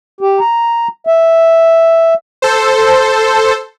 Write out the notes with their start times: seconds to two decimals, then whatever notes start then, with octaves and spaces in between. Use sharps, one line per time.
0.21 G4
0.39 A#5
1.07 E5
2.42 A4 C5